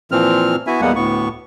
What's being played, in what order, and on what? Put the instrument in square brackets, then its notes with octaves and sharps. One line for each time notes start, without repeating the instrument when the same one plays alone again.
[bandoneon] A#2 E3 F3 C4 F6
B3 E4 F#4 E5 G#5
E2 G3 G#3 A#3 B3 F#5
D2 A2 B3 C#6